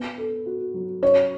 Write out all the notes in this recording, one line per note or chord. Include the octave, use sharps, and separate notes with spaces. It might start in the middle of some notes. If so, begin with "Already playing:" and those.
Already playing: B3
A4
F#4
F#3
C#4 C#5